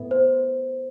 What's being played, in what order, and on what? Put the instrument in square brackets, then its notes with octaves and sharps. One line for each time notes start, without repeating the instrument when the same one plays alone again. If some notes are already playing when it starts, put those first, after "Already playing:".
Already playing: [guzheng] A2 B3
[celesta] C5